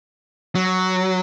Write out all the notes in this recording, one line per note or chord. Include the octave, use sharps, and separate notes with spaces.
F#3